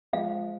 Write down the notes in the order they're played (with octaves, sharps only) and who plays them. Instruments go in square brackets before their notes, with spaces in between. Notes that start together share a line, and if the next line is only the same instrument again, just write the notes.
[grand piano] F3 G#3 [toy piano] F5